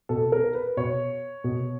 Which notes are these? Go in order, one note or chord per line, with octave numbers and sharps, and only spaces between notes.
B2 A4
A#4
B4
B2 C#5
B2